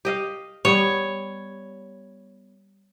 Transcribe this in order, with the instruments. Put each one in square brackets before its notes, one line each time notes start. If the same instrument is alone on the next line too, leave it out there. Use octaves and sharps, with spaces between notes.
[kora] G4 D#5 F5
[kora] G3 B3 [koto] C#5